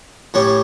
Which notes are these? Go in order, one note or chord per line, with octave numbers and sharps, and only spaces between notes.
A2 G3 C#4